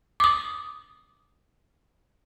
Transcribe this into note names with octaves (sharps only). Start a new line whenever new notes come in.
D6 D#6